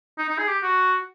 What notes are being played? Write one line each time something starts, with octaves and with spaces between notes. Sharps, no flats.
D#4
D#4
G#4
G4
F#4